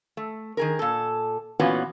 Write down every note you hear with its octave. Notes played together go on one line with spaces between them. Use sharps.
A3
D#3 G#4 A#4
A#2 A4
A#2 E3 B3 C#4 F4 F#4